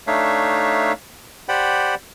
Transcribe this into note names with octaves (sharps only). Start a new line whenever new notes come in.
A3 D4 D#4 C#5 E5 F5
G4 C5 D5 F#5 G5 B5